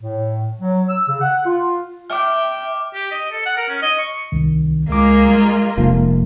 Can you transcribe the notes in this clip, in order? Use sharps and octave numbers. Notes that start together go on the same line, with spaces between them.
A2
F#3
E6
C#3
F#5
F4
E5 G5 D6 F6
G4
D#5
A4
F#5
A#4
C#4
D#5
C#6
C2 D#3
C#2 G#3 A#3 F4 D6
G3
F1 F3 A#3